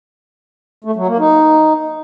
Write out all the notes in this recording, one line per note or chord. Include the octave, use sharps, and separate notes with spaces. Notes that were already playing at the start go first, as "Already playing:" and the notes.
A3
F#3
A#3
D#4